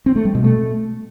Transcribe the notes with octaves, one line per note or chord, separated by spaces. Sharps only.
C4
A3
G3
B2
A3